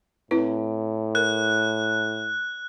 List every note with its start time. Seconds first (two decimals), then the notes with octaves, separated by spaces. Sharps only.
0.31 A2 C4 E4 B4
1.15 A#4 F#6